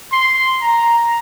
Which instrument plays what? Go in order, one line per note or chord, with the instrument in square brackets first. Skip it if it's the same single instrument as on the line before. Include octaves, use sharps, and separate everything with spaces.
[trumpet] C6
A#5